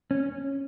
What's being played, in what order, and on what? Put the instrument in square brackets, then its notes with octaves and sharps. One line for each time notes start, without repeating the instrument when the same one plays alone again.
[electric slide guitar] C#4